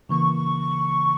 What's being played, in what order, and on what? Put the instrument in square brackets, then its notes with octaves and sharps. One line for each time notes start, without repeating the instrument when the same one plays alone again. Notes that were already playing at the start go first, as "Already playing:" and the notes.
[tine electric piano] C#3 E3 A#3 [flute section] C#6